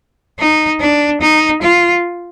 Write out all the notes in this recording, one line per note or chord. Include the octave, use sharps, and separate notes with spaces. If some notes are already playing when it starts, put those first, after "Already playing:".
D#4
D4
D#4
F4